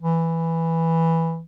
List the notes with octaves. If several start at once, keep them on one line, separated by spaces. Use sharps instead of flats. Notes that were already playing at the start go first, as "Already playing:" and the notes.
E3